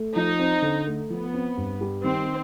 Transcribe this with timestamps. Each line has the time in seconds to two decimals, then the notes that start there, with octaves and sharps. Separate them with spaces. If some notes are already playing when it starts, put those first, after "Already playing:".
Already playing: A3
0.16 F3 D#4
0.39 C4
0.62 D3
0.87 A3
1.10 F3 B3
1.34 C4
1.57 G2
1.81 G3
2.04 D#3 C4